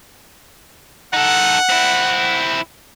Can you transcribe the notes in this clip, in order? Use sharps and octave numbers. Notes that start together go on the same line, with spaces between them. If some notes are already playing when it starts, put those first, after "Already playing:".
D#4 A4 F#5
C4 E4